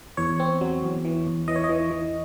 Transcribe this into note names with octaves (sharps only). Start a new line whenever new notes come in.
E2 C#5
C4
F#3
E2
E3
E2
E3 D#5
C#5
D#5
E3
E3